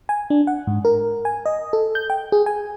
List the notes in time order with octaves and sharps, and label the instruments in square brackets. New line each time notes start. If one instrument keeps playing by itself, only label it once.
[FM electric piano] G#5
D4
F#5
G#2
A#4
G#5
D#5
A4
G6
G5
G#4
G#5